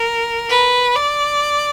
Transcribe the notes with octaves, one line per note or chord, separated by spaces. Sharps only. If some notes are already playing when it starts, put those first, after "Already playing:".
Already playing: A#4
B4
D5